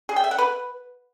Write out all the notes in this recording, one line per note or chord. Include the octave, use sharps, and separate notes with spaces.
G#4
G5
E5
F#5
B4